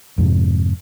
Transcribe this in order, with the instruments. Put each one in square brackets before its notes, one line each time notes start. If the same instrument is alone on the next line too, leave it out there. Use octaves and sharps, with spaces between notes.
[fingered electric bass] F2 G#2 C3